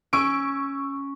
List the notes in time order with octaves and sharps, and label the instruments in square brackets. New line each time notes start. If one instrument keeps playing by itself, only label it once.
[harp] C#4 [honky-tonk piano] C#6 E6 D7